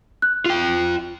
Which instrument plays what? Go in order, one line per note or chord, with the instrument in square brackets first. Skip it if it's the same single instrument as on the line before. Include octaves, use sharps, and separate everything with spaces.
[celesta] F#6
[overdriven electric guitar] F4 G5